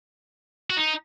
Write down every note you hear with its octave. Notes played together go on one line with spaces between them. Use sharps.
F#4
D#4